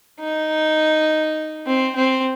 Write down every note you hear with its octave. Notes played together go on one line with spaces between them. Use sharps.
D#4
C4
C4